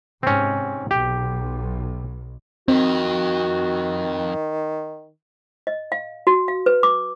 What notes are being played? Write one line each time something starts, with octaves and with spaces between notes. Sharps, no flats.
G#2 C3 C4 C#4
B1 G4
F2 D#3 C4 F#4
D#5
F5
F#4
F5
B4
D6